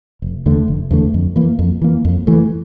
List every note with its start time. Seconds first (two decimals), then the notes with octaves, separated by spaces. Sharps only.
0.22 F1
0.46 E2 D3 A3
0.68 F1
0.91 E2 D3 A3
1.14 F2
1.36 E3 A#3
1.59 F2
1.82 E3 A#3
2.05 F2
2.27 E3 A3